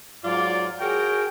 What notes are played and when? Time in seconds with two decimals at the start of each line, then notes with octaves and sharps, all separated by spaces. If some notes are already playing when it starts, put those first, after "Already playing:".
0.24 G#2 F#3 F4 D5
0.80 F#4 G#4 A#4 C#5 G5